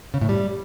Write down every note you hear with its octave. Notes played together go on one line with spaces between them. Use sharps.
C#3
A2
G3